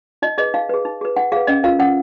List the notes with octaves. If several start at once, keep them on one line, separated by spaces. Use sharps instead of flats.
D#4 D#5
G#4 B4 D#5
D#4 F5
G#4 B4
D#4
G#4 B4
D#4 F#5
G#4 B4 F5
C#4 D#5
F4 A#4 F5
C#4 F#5